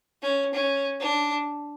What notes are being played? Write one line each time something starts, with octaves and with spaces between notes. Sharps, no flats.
C#4
C#4
D4